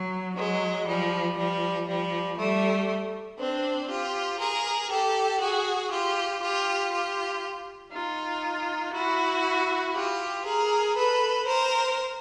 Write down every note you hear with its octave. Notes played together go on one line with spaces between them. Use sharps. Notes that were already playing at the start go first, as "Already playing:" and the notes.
Already playing: F#3
F#3 G#3
F3 G3
F3 G3
F3 G3
G3 A3
C4 D4
F4 G4
G#4 A#4
G4 A4
F#4 G#4
F4 G4
F4 G4
F4 G4
D#4 F4
E4 F#4
F4 G4
G#4 A#4
A4 B4
A#4 C5